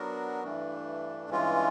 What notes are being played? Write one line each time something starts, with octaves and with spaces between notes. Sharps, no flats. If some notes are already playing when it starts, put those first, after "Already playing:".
Already playing: F#3 B3 D4 F#4 A#4
G2 E3 A3 D4
G2 E3 G#3 C#4 F4